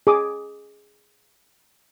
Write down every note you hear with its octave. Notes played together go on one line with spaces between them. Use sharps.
G#4 D6 D#6